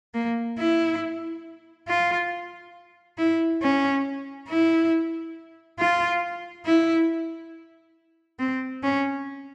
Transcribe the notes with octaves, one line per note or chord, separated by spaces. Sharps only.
A#3
E4
F4
E4
C#4
E4
F4
E4
C4
C#4